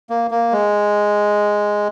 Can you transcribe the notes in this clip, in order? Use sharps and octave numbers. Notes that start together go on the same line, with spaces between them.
A#3
A#3
G#3